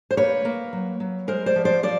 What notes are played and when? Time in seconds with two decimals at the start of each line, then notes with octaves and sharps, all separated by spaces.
0.11 C5
0.17 A#3 B4 C#5
0.45 A#3
0.73 F#3
1.00 F#3
1.28 G#3 A#4 C5
1.46 C5 D5
1.56 F3
1.65 C5 D5
1.83 F3 C5 D5